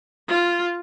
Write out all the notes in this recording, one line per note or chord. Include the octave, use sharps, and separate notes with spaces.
F4